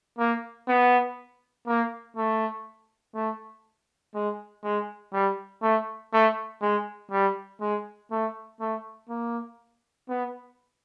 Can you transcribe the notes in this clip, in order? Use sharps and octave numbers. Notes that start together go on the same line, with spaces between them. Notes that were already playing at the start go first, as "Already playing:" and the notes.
A#3
B3
A#3
A3
A3
G#3
G#3
G3
A3
A3
G#3
G3
G#3
A3
A3
A#3
B3